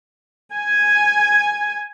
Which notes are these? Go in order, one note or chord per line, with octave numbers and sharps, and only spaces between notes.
G#5